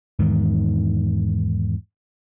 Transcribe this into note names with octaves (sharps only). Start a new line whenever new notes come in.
E2 G#2 D#3